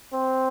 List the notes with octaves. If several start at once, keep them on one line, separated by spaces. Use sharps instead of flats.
C4